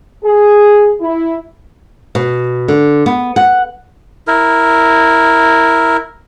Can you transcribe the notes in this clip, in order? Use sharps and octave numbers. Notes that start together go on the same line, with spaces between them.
G#4
E4
B2
D3
B3
F#5
E4 A#4